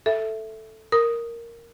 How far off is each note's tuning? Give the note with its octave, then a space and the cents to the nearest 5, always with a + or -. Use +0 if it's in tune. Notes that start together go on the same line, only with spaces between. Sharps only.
A4 +0 E5 +0
A#4 +0 D#6 +0